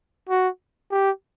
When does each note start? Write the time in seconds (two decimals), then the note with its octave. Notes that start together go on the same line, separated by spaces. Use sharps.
0.30 F#4
0.92 G4